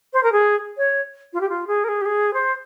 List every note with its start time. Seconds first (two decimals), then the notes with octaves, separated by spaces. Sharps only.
0.13 C5
0.23 A#4
0.32 G#4
0.77 C#5
1.33 F4
1.41 G4
1.49 F4
1.67 G#4
1.84 A#4
1.88 G#4
2.01 G4
2.05 G#4
2.34 C5